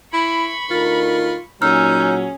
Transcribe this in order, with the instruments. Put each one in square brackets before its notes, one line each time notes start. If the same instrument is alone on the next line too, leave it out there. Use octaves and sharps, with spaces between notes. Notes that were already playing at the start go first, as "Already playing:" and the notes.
[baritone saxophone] E4 [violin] B5 C#6
[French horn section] D2 D#4 A#4 [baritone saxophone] F4
[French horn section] A#2 F#3 [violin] C#4 G#4 [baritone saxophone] D#4 [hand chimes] E6 F6